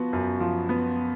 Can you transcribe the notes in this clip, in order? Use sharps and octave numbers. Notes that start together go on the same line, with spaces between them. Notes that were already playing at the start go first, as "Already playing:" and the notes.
Already playing: F3 B3 F#4
F#2
F3
B3